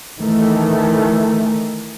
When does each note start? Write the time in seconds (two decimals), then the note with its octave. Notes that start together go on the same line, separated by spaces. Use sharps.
0.18 D#3 E3 A3